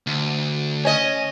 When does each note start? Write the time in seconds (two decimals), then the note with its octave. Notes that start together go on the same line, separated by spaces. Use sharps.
0.07 D2
0.85 C#4 D#5